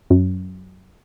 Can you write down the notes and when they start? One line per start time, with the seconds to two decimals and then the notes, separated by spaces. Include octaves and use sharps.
0.10 F#2